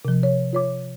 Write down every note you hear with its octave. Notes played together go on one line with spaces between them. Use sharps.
C3 F3
C#5
F4 C#5 D6